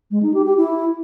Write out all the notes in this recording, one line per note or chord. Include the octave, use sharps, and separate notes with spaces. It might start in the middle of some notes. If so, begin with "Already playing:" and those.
G#3
D#4
G4
G4
E4